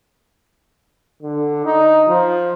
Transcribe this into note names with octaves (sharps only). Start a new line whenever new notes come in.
D3
D#4
F3